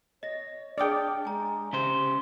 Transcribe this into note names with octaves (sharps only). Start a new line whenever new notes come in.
C#5 D#5 A#6
D4 G#4 D5 G5 D#6 F6
G#3 G#5 A#5
C#3 G4 C5